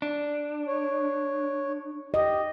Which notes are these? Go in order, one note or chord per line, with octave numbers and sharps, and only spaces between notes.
D4
C#5
G4 D#5